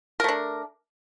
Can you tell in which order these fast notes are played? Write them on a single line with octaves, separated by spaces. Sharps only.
A#4 A3 D4